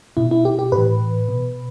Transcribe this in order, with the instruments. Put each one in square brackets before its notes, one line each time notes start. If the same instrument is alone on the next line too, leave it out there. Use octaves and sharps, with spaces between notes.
[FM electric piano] B2 E4
E4
G4
G4
A2 B4
E3
B2